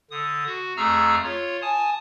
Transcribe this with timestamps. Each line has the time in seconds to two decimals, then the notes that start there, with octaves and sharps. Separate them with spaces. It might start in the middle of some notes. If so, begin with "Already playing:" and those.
0.11 D3 D#6
0.46 F#4
0.77 F2 A3 G#4 A#5 E6 F6
1.24 F4 C#5
1.62 G#5 A5 D#6